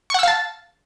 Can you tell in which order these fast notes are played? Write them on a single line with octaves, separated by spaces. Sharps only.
C#6 F#5 E6 F5 A5